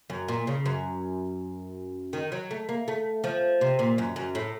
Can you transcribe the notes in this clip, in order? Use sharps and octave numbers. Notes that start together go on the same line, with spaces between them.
F#2
A#2
C#3
F#2
D#3
F#3
A3
A#3
A3
F3
C3
A#2
F#2
F#2
A2